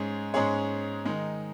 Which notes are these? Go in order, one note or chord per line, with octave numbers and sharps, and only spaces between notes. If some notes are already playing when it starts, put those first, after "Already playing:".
Already playing: G#2 G#3 C#4 G#4
G#2 G#3 C#4 G#4 C#5
D#3 G#3 D#4